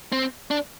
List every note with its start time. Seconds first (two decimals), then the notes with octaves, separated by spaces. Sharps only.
0.12 C4
0.51 D4